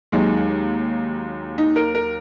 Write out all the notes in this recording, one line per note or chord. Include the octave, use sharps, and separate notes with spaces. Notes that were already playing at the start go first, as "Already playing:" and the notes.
D#2 D#3 F#3 G#3
D#4
A#4
A#4